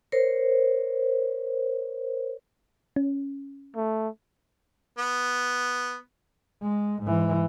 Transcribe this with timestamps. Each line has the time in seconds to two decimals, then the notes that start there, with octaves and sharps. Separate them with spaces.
0.12 A#4 C5 C#5
2.96 C#4
3.76 A3
4.98 B3
6.63 G#3
7.03 G#2 E3